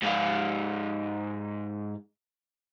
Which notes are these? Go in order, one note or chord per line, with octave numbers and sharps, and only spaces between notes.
G#2 F5